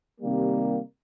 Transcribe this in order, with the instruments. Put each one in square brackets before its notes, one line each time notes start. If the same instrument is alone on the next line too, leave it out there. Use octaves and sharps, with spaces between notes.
[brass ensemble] C3 D#3 G3 A#3